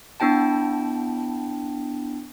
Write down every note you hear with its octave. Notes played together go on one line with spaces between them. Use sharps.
B3 D4 E4 G5 A5